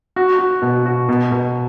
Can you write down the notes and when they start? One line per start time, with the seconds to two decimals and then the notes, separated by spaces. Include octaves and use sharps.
0.16 F#4
0.39 F#4
0.62 B2
0.86 F#4
1.09 B2
1.32 B2